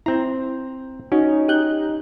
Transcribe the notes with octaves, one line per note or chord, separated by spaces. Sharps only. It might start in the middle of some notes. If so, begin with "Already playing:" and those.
C4 E4 A#5
C#4 D#4 F#4
D#4 G4 F#6 G6